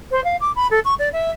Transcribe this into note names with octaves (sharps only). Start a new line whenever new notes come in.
C5
F5
D6
B5
A4
C#6
D5
E5